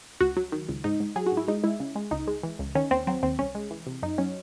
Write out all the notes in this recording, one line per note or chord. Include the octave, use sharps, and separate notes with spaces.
C#2 F#4
F#3
D#3
C#2
G#2 D#4
G#2
F#3 G#4
F#4
G#2
E4
G#3 D#4
G#3 E4
C#3
G#3
C#2 D#4
G#3
E3
C#2
D#3 C#4
D#2 C4
F#3 C4
D#2 C4
C2 C#4
G#3
E3
C3
F#2 D#4
F#3 C#4